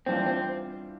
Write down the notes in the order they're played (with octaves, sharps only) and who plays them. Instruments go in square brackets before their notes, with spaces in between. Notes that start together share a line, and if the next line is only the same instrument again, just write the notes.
[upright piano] E3 G3 D4 F4 [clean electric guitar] C4
[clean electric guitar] C4